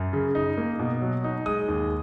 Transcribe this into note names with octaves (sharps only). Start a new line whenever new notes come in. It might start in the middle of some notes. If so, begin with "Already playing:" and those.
Already playing: F#2
C#3
D#4
A#3
B2
F#3
D#4
G#3 D#6
D#2